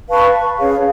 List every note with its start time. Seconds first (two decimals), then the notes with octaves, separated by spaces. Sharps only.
0.09 B4 F5 A5 C#6
0.57 C#4 G#4 C#5 F5